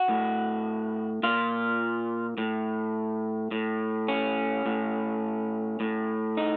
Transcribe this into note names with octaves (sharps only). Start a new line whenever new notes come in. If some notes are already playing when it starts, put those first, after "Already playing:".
Already playing: F#4
A2
A#2 F4
A2
A2
C#4
A2
A2
D#4